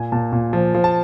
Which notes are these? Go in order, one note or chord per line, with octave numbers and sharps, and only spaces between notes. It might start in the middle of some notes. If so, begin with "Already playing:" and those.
Already playing: A#2 G#5
A#2 A5
A#2
F3
F3
A5